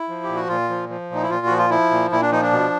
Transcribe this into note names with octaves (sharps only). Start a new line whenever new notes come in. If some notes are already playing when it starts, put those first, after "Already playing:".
Already playing: E4
F3
G4
A#2
F#4
A#2 F4
F3
F3
A#2 D#4
E4
A#2 F4
F3 F#4
F4
F3 E4
A#2
A#2 E4
D4
F3 D#4
D4
B2